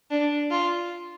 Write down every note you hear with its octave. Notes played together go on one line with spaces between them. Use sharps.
D4
F4